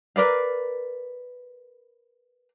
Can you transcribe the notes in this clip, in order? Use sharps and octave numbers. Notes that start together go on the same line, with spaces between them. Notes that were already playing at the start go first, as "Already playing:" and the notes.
A#4 B4 D5 F5